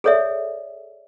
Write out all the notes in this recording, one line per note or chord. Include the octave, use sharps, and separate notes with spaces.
G#4 A4 C#5 D5 E5